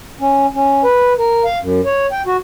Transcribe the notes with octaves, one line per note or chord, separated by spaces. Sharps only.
C#4
C#4
B4
A#4
F5
F#2
C#5
G5
F#4